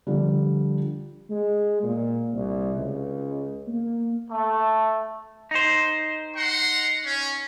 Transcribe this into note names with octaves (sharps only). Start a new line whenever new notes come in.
D3 F3 G3
G#3
A#2
C2
C#2
A#3
A3
D#4 C5
F#5 A#5 C6
C#4